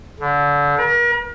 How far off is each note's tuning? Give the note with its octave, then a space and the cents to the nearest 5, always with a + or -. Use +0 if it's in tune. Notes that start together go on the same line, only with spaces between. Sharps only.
D3 -30
A#4 +40